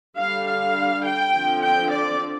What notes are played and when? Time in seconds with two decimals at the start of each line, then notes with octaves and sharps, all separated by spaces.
0.17 D3 G3 D4 F5
0.46 F5
1.04 G5
1.33 D3 F3 C4
1.62 G5
1.90 D5